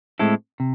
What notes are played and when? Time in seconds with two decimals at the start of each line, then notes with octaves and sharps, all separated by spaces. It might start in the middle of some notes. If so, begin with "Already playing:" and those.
0.19 A2 G#3 C4 E4 A4
0.60 C3